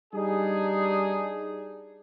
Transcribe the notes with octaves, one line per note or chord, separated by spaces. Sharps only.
G3 D4 D#4 G#4